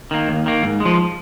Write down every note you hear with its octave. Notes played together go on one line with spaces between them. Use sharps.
D#3 A#3
D#2
D#3 A#3
G#2
G#3
F3